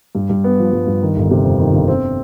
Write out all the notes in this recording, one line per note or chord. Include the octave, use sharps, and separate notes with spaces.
G2
G2
B3
F3
G2
G2
D#3
G1
C3
F2
D#3
G1
C4